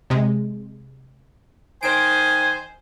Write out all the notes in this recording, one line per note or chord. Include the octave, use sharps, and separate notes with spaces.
C3 G#3
D#3 C5 G#5 D7